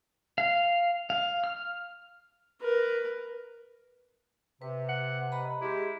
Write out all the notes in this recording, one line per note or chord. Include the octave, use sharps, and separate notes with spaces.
F5
F5
F6
A#4 B4
C3 B4
F#5
B4 D#5 A#5 B5
G#3 E4 G4